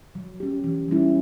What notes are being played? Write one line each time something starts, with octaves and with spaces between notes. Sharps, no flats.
F#3
C#4 G4
E3
G3 C#4 E4